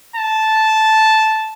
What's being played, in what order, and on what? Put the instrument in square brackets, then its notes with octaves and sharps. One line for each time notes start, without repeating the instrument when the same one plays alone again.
[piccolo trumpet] A5